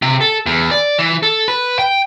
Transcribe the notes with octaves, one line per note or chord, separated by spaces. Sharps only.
C3
A4
E2
D5
E3
A4
B4
G5